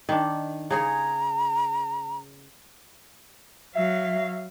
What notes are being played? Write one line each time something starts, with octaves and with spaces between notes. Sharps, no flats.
D#3 D4
C#3 G#4 C#5 A#5
F#3 E5 F5